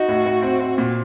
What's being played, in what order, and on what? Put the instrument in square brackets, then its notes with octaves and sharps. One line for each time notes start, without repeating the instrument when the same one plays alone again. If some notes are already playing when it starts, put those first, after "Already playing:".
Already playing: [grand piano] D#4 [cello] F#4
[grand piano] A2
A2
C4
C4
A#2